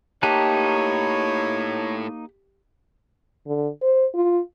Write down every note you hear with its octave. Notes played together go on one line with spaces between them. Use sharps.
A2 A#3 D#4 G4 C#5 A5 F#6
D3
C5
F4